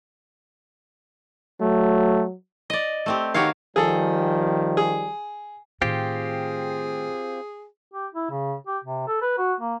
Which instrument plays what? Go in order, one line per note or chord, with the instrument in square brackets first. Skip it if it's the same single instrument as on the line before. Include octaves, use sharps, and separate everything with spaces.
[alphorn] F#3 [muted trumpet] A3
[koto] D5 D#5
A3 C4 G4
D#3 F#4 G4 C#5 F5
[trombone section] D#3 F3 G3 [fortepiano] G#4 A4
[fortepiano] G#4
[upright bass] A2 D#3 [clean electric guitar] C4 F4 G4 [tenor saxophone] G#4
[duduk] G4
E4
C#3
G4
C3
A4
B4
F#4
A#3